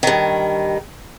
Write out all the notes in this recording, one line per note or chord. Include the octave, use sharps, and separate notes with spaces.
G2 D#3